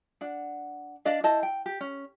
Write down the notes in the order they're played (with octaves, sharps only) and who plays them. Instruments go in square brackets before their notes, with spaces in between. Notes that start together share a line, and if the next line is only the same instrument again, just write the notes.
[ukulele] D4 F#5
D4 D5 D#5 F5
E4 C5 D#5 A5
G5
G4
C#4